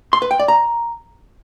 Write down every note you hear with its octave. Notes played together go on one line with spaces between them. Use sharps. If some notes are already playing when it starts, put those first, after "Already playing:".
C6
B4
G5
D5
A#5